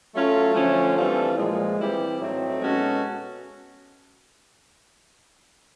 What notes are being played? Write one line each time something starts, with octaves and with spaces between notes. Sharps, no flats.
F#3 A3 C#4 F4 A4
D3 F3 A3 C#4
E3 G3 C4 F4 A4
A#2 F3 G#3
E3 G3 C4 E4 G4
A2 F#3 A3 C4 D#4
B2 G#3 C#4 F#4 A4